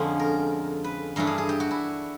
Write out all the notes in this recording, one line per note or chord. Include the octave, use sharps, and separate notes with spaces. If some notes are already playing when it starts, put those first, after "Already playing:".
Already playing: F2 D3 F3 G#3 C#4
A#4
B4
G2 E3 A3 D4 A#4
G#4
G#4
G4
F#4
E4